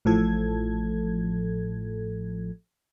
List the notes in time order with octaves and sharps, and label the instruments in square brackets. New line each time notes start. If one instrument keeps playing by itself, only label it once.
[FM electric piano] A1 A2 F3 A4 G#6